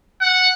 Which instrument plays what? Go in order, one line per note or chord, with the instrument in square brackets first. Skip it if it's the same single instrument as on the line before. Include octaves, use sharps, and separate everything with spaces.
[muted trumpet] F#5